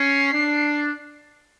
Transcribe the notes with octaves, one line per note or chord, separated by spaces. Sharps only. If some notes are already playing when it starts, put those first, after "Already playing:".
Already playing: C#4 C7
D4